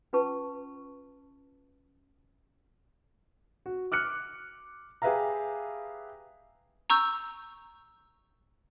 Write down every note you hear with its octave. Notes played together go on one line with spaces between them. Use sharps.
C#4 F4 B4 A5 C#6
F#4
D6 F6 F#6 C#7
G4 G#4 B4 E5 F5 A#5
A#5 C#6 E6 G6